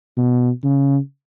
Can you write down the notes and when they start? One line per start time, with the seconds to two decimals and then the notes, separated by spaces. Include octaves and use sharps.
0.17 B2
0.64 C#3